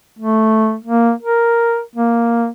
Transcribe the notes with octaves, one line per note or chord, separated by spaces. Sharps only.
A3
A#3
A#4
A#3